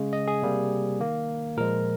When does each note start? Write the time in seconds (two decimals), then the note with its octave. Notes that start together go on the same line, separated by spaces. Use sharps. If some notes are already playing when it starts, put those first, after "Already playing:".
Already playing: C#3 G#3
0.13 D#5
0.28 G#4
0.42 C3 G3 A#3
1.00 D#3 A#3
1.57 A#2 F3 G#3 A#4